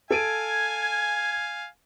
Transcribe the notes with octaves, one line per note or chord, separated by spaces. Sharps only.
A4 F5 G#5 G#6 D7 D#7